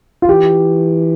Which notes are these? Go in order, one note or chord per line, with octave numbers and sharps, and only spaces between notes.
F4
E3 G4